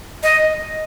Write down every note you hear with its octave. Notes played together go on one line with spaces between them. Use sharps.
D#5